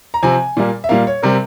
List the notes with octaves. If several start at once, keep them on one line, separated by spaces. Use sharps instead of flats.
A#5
C3 F3 C4 G#5
A#2 G3 A#3
E5
A#2 G3 A#3 F5
C#5
C3 G3 C4 A#4